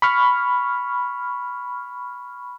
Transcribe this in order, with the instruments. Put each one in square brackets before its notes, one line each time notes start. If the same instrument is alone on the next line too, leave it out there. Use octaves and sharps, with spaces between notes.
[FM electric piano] B5 C#6 F6